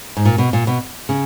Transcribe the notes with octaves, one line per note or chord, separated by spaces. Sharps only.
G#2
A#2
B2
A#2
B2
C#3